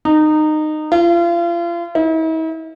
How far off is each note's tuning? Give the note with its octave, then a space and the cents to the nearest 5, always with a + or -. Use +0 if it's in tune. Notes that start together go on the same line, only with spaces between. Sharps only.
D#4 -20
F4 -35
E4 -45